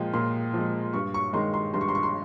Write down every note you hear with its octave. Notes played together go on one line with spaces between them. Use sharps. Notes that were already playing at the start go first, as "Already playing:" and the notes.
Already playing: A#2 F3 G#3 G5
A#2 C6
F3 G#3
G2 C#6
C#6
D#3 G#3 C6
C6
G2 C6
C#6
C6
C#6
C6